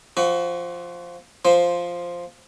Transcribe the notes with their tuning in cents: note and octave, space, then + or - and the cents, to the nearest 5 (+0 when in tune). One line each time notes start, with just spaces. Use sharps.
F3 +0 F#4 +25
F3 +0 C5 +0